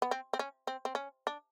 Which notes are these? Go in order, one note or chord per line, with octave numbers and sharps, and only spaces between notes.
B3
C4
C4
C#4
C4
C4
C#4
D4